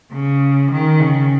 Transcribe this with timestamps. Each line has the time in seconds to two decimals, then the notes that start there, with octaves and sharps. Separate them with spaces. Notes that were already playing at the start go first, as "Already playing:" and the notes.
0.12 C#3
0.71 D#3
1.00 C#3